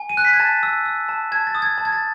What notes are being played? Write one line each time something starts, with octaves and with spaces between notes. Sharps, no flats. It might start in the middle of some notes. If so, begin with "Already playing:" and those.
Already playing: G#5
D#7
F#6
B6
G#6
A5 A6
E6
E6
A5
A5 G#6
A6
D#6
G#6
A5
G#6
A6